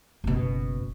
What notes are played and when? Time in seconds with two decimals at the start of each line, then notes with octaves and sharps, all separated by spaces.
0.24 F#1 B2